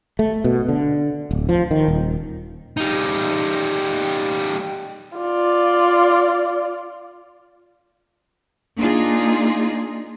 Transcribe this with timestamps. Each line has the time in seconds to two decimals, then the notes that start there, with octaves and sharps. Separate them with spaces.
0.19 A3
0.44 B2
0.69 D3
1.31 D1
1.49 F3
1.71 D#3
1.88 D#1
2.77 G3 D#4
5.18 F4 D5
8.77 A#3 D4 D#4 F4 G#4